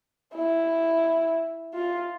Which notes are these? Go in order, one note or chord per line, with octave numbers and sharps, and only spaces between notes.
E4
F4